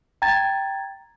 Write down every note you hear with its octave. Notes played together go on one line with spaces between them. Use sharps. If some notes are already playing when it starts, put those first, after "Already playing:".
G5 A#5 G#6 A6